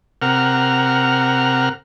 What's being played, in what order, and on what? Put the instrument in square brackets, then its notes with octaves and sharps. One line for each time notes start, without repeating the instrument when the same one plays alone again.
[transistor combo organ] C3 A#4 F#5 F6